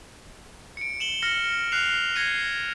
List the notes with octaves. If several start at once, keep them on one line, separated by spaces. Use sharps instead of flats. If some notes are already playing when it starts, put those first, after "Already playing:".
C#7 D7
E7 F#7 G7
F6 A#6 C#7
F6 F#6 C7 F7
G#6 A#6 C7 C#7 D#7